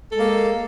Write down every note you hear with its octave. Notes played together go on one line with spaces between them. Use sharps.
G#3 A#3 A4